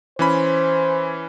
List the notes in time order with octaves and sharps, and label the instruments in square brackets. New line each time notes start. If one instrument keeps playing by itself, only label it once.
[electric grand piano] E3 C#4 B5 [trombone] C5